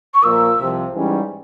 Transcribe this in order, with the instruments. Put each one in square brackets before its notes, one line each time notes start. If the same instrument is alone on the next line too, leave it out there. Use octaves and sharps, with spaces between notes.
[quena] C#6
[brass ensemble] A#2 F3 A#3 F4 A#4 [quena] E6
[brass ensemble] C2 C3 F3
G#2 E3 G3 C#4